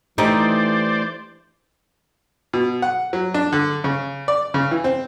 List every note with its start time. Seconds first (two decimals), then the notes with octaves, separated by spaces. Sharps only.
0.18 E3 A3 D#4 G4 C5 D5
2.53 B2
2.82 F#5
3.13 F#3
3.34 D4
3.53 D3
3.84 C#3
4.28 D5
4.54 C#3
4.71 E3
4.84 C4